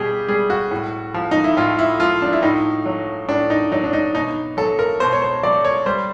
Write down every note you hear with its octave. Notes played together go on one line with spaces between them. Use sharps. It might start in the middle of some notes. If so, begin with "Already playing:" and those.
Already playing: B2 G3 G4 G#4
G3 G#4
F#4
A2
F3
D#4
E4
A2 F4
E4
F3 F4
D4
E4
A2 D#4
F#3
A2 D4
D#4
F#3 D#4
D4
D#4
B2 D#4
F#3 A4
A#4
B2 C5
C#5
C5
F#3 D5
C#5
G3 C5